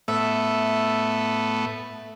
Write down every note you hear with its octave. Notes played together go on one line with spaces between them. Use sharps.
A2 A3 B3 E5